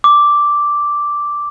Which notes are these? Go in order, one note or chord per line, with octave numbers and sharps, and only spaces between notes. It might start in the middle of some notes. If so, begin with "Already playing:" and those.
D6